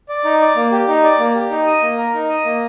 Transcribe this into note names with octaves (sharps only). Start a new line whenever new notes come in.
D5
D#4
D5
A#3
G4
D#4
D5
A#3
G4
D#4
D#5
A#3
A#4
D#4
D#5
A#3